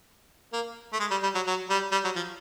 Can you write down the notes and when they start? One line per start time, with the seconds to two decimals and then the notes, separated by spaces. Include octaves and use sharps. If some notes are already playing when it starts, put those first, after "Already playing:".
0.53 A#3
0.93 A3
1.00 G#3
1.11 G3
1.23 G3
1.35 F#3
1.47 F#3
1.70 G3
1.92 G3
2.04 F#3
2.16 F3